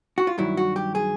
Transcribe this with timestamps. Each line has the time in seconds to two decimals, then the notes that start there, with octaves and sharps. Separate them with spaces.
0.18 F#4
0.27 F4
0.38 G2 D#3 F#3 E4
0.57 F#4
0.76 G4
0.95 G#4